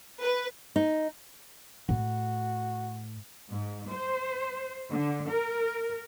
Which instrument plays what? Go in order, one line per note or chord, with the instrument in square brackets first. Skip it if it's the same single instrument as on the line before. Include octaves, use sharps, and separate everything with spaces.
[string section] B4
[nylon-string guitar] D#4
[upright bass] A2 [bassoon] F#4
[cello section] G#2
C5
D3
A#4